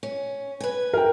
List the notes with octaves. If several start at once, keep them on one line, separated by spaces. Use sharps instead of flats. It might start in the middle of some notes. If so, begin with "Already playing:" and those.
C#4
B4 G#5
A#4 G5